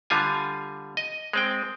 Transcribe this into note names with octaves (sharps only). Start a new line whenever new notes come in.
D3 G3 F4 G#5
D#5
G#3 C4 G5